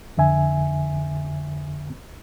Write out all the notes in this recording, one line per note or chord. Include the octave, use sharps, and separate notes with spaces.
F2 D3 E5 G#5